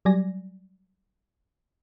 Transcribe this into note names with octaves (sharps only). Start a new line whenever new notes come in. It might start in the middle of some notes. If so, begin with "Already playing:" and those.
F#3 G3 D5 G#5 A#6